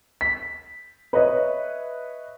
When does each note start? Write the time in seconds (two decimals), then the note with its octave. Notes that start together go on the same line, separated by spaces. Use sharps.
0.21 B6
1.13 B4 C#5 D#5 E5